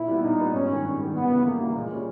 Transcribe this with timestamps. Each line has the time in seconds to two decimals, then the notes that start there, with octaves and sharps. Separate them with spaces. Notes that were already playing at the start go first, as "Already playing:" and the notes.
Already playing: A#2 E4
0.08 G3 B3
0.23 A#2 D#4
0.39 G3 B3
0.54 G#2 C#4
0.69 D#3 G3
0.85 G#2
0.99 D#3 G3
1.15 C#2 B3
1.30 C#3 E3 G3
1.45 C#2 A#3
1.60 C#3 E3 G3
1.76 A#2 G#3
1.91 G3 C#4